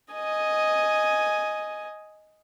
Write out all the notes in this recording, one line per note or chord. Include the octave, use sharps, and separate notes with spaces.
D#5 G#5